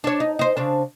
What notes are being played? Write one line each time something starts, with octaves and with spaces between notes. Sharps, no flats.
D4 C#5
D#4
D#4 C5
C#3 C4 D4